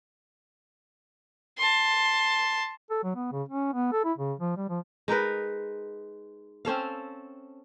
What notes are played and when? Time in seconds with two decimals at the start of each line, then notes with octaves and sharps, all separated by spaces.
1.58 A5 C6
2.90 A4
3.04 F#3
3.16 B3
3.32 C#3
3.49 C#4
3.73 B3
3.92 A4
4.05 E4
4.18 C#3
4.40 F3
4.57 G3
4.69 F3
5.08 G#3 D#4 A#4 B4
6.65 C4 C#4 A4 F5